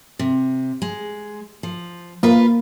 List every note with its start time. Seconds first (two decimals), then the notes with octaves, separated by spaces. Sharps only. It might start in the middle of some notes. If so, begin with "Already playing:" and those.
0.19 C3
0.82 G#3
1.63 F3
2.23 A#3 F4 B4